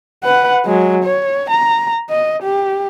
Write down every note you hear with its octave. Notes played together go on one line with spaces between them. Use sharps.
B4 F#5
F#3 G#3
C#5
A#5
D#5
G4